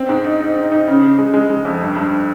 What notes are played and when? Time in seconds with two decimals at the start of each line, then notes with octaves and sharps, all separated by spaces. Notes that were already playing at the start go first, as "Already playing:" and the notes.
Already playing: C4
0.09 G#2
0.24 D#4
0.40 D#4
0.56 D#4
0.72 D#4
0.88 C#3
1.03 C#3
1.19 G#3
1.34 G#3
1.50 G#3
1.65 F2
1.81 G2
1.96 G2